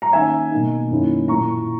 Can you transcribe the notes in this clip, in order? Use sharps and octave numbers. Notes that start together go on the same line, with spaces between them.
A#5
D#3 A#3 C#4 E5 G#5
B2 A#3 D#4
F#2 D#3 A#3 C#4 E4
A#2 A#3 E4 A#5 C#6